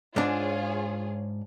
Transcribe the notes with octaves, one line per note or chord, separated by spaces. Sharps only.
G#2 D4 F4 G#4 C#5